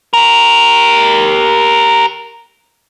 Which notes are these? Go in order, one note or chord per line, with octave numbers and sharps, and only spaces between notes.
G4 A#4